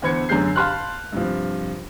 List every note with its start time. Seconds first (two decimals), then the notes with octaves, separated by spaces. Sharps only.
0.02 E2 D3 C5 B5 G#6 C#7
0.29 F#2 D3 G#4 G6 C7
0.56 F5 A5 B5 C6 F6 F#6
1.12 G2 C3 F3